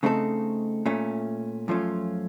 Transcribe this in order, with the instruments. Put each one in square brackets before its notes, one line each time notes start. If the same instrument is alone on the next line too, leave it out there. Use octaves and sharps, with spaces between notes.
[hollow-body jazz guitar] C#3 A3 C4 D#4 A4
A#2 A3 C#4
F#2 F3 A3 C#4 F4